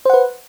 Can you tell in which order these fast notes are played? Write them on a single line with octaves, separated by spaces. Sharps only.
C5 F#5 B4